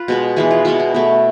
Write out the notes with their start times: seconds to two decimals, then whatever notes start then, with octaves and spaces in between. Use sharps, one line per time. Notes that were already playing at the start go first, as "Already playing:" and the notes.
Already playing: F4 B4
0.08 B2 G#3 B3
0.36 E3 G#3 B3 G#4
0.51 F4
0.65 B2 G#3 B3 E4
0.79 E4
0.94 B2 A3